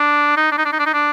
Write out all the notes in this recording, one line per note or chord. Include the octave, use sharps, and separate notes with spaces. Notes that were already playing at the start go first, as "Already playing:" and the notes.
Already playing: D4
D#4
D4
D#4
D4
D#4
D4
D#4
D4